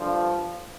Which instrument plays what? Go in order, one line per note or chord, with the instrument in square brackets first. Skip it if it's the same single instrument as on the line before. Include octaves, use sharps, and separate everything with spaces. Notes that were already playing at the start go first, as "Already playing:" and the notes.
Already playing: [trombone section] G2 D3 F3